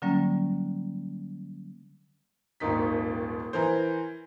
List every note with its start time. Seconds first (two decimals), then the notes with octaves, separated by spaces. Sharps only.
0.02 D3 F#3 G3 A#3 C#4
2.60 D#1 G#1 D#2 D#3 D#4 B6
3.53 E3 A#4 C5